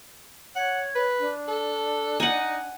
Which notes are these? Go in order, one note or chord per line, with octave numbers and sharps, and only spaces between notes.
C#5 F#5
B4
D4
A4
D#4 F#5 G#5